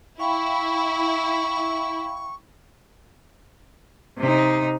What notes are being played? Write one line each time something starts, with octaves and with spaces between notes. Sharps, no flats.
E4 F5 G5 B5 C#6
C3 D#4